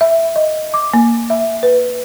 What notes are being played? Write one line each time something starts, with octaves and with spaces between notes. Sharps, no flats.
E5
D#5
D6
A#3
E5
B4